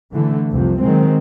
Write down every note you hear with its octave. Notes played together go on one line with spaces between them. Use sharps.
D3 E3 A3
C2 F2 C3 F3
D#3 F#3 G#3 C4